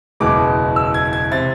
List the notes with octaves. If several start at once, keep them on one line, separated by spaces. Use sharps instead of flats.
F#1 E2 B2 G#3 D6
E6
G#6
G#6
C3 A6